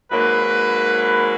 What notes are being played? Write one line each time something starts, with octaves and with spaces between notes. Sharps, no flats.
G#2 F#3 A#3 B4